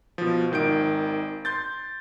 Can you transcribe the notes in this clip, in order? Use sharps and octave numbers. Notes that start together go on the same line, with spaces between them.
B2 F3
G#1 D#3 G6 D7
C6 G6 A6